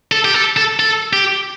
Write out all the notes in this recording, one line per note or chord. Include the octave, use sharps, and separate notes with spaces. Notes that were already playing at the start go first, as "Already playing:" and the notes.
A4
G4
A4
A4
A4
G4